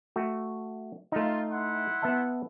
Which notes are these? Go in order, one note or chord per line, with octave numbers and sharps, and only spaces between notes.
A3 F#4
A3 D#4 F4
E4 F#5 C6
B3 E5 A5